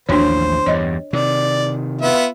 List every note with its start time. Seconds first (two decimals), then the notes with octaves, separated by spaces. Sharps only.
0.09 A1 D#2 F3 D4 F#4 C5 C#5
0.66 E2 G2 C#5 D#5
1.13 C3 D#3 D5
2.01 B3 F4 E5